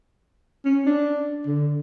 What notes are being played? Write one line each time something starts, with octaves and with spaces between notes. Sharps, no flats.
C#4
D4
D3